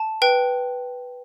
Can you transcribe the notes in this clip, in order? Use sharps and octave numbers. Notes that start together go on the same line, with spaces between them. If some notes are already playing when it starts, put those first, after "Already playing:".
Already playing: A5
B4 G5